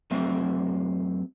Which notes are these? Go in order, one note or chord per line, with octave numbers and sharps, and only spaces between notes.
F#2 A3 C4 E5